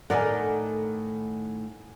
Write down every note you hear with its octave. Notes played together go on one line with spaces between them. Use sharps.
A2 D#3 A3 A#4 D5 F#5 G#5